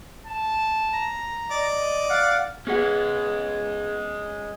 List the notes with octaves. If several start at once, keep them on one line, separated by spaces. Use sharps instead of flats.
A5
A#5
D5 D#5
F5 F#5
G#3 B3 C#4 G#4 F#5